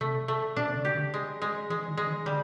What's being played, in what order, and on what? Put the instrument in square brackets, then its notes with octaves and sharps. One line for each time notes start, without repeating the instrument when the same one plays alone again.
[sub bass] C3 [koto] A3
[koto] A3
[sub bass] B2 [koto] D4
[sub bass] C#3
[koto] G4
[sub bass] D3
[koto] G#3
G#3
[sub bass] E3 [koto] G#3
[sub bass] D#3
[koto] G#3
[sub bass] D#3
[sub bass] D3 [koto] G3